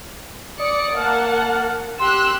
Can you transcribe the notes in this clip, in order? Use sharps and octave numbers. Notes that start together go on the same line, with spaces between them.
D5 D#6 C#7
A#3 F#5 A5 F6
G4 C6 E6 F#6